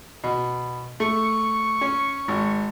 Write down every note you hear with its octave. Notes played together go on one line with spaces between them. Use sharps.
B2
A3 C#6
C#4
G#1